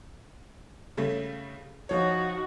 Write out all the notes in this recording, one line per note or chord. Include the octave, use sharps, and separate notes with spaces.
C#3 G3 A3
F3 D#4 F#4 C#5